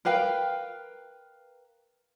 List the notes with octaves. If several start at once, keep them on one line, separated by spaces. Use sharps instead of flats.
A#4 B4 F5 G5